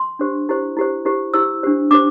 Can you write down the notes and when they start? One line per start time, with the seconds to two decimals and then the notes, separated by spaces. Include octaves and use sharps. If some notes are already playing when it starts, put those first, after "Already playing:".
Already playing: C6
0.19 D4 G4 C5
0.49 E4 G4 C5
0.77 E4 G4 C5
1.05 E4 G4 C5
1.34 E4 G4 C5 E6
1.63 D4 G4 C5
1.91 D4 G4 C5 D6